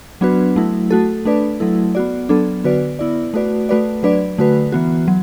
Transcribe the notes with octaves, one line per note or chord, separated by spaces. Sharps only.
F#3 B3 D4 F#4 B4
F#3 A3 E4
A3 F#4 A4
A3 D4 B4 D5
F#3 A3 E4 A4
B3 F#4 D5
F#3 B3 D4 A4
D3 B3 F#4 B4 D5
B3 E4 D5
A3 F#4 B4 D5
A3 F#4 B4 D5
F#3 D4 B4 D5
D3 A3 F#4 B4
E3 B3 F#4
F#3